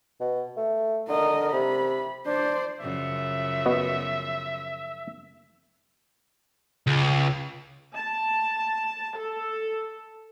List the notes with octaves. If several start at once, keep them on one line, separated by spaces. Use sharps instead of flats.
B2
A3
D3 A#4 D#5
C3 B5
D4 C5 D5
F#2 C#3 F3 E5
B3 F#4 D#5
C#2
A5
A4